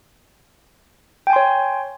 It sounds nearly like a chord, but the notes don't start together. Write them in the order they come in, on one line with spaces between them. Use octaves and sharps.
G5 G#5 C6 C#5